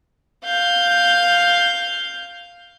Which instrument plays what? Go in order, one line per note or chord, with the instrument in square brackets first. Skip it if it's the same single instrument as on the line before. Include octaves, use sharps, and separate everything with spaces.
[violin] F5 G6